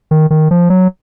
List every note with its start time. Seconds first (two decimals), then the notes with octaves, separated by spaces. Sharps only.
0.11 D#3
0.30 D#3
0.51 F3
0.70 F#3